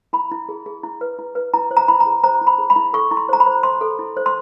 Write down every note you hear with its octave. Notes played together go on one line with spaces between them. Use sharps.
E4 B5
E4
G#4
G#4
E4
B4
E4
B4
E4 A#5
C5
A#5
E4 B5
A#5
G#4
C5 A#5
E4
B5
G#4
B5
E4
A4 C#6
E4
C6
C5 A#5
B5
C5
C5 C6
A4
E4
C5
C6